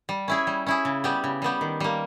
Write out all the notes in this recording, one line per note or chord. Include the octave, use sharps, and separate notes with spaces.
G3
C#4 E4 G#4
G3
C#4 E4 G#4
C#3
G3 B3 G4
C#3
G3 B3 G4
D#3
G3 A#3